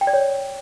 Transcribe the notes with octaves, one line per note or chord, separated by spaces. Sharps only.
G5
D5
C#5